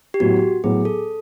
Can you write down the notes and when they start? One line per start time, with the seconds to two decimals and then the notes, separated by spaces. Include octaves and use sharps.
0.14 G4
0.20 A2 F#3 B3 F#4
0.64 A2 F#3 B3 G#4
0.85 A4